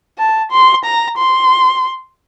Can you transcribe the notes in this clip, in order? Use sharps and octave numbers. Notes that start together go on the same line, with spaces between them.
A5
C6
A#5
C6